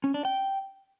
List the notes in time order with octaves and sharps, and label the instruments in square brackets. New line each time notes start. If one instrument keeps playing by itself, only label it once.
[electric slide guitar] C#4
D4
G5